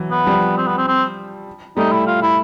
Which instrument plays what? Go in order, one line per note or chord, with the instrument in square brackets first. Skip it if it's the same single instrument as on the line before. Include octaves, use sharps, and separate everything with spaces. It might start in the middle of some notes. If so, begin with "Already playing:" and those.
Already playing: [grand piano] E3 F#3
[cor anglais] B3
[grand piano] F3 G3
[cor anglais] C4
B3
C4
C4
[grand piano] G3 A3 [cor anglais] D#4
[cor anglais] E4
F4
E4